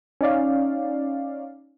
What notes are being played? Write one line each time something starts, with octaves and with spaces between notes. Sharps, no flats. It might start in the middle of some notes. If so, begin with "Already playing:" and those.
C#4 D#4 D5 F5